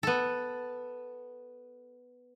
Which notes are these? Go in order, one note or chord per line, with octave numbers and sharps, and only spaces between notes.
B3 A4